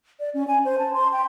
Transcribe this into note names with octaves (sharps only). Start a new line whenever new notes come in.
D5
C#4
G#5
C5
A5
C6
G5